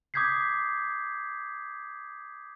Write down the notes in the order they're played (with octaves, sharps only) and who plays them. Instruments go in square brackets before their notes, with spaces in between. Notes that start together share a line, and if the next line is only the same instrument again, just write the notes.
[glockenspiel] D6 D#6 G6 G#6 B6 C7